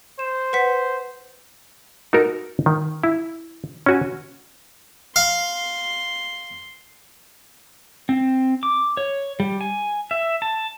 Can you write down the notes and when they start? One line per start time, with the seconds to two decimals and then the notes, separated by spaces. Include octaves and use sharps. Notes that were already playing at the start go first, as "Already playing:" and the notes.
0.19 C5 E7
0.53 B4 F#5 B6
2.13 D#4 F#4 A4 A#4
2.66 D#3
3.04 E4
3.86 C#4 F#4 G#5
5.16 F5 C6
8.09 C4
8.63 D6
8.97 C#5
9.40 G3
9.61 G#5
10.11 E5
10.42 A5